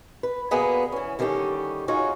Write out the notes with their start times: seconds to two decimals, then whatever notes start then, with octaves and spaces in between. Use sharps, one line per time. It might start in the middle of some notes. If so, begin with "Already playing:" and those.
0.23 B4
0.51 B2 D3 A#3 B3 G#4 B4
0.92 E3 C#4
1.19 D3 D#3 G3 C#4 G4
1.88 C#4 D#4 F4 F#4 G#4 C#5